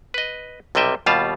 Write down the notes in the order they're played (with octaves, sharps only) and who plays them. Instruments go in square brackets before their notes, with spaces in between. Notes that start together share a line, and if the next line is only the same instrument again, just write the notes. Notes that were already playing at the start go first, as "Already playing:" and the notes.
[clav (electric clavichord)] B4 D#5
B1 C3 G3 D#5 E5 G5
D#2 B2 G3 F4 F5 A5